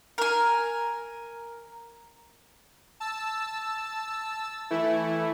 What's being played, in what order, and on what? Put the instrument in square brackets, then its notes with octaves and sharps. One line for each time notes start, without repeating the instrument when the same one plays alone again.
[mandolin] A#4 G#5
[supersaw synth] A5 E6
E3 A3 E4